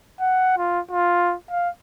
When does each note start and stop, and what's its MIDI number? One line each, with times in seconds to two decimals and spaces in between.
0.20 0.55 78
0.57 0.80 65
0.91 1.34 65
1.50 1.69 77